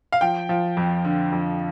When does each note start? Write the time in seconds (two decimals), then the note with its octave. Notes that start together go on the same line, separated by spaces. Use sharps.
0.12 F5
0.21 F3 G5
0.49 F3
0.77 F2
1.05 D3
1.32 F2